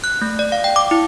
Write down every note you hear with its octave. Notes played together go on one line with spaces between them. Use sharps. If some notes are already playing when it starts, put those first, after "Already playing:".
F#6
A3
D5
F5
G5
D6
E4